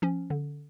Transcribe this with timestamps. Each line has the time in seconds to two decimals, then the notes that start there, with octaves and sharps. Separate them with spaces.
0.02 F3 C#4
0.30 D3